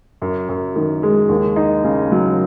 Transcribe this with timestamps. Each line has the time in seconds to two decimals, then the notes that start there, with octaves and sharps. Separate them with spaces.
0.22 F#2
0.49 F#2
0.76 D#3
1.03 G#3
1.29 D#2
1.56 D#4
1.84 C#3
2.12 F#3